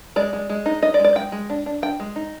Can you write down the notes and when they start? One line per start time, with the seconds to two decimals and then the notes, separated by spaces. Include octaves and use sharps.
0.16 G#3 D5
0.33 G#3
0.49 G#3
0.66 D#4
0.82 D#4 D#5
0.94 D5
0.99 G#3
1.04 D5
1.15 G#3 G5
1.32 G#3
1.50 D4
1.66 D4
1.82 D4 G5
2.00 G#3
2.16 D#4